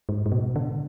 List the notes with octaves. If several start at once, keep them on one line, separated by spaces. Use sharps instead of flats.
G#2
G#2
B2
D3